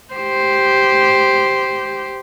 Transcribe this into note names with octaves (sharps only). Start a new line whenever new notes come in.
G4 C5